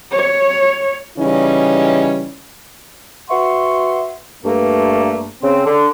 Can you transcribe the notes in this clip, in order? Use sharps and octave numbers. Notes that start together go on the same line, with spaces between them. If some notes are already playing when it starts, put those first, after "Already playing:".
C#5
C#3 E3 G3 C#4 D#4
F#4 B4 E5 F#5 C6 C#6
G2 A3 A#3
C#3 C4
D3